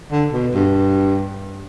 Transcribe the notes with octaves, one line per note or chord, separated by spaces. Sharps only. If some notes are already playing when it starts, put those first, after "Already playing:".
D3
B2
G2